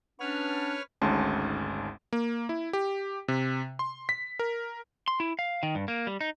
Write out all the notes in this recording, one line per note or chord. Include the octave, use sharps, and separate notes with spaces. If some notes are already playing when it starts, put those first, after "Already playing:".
B3 C#4 D4 B4 C#5 F6
G#1 D2 G#2 C#4 A5 C6
A#3
E4
G4
C3
C6
B6
A#4
C6
E4
F5
D#3
G2
A#3
G3
D#4